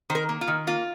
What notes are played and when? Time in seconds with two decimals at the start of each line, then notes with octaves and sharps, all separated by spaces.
0.10 D#3 C5
0.15 A#4
0.29 A#3
0.41 F4
0.48 D#3
0.67 A#3 F4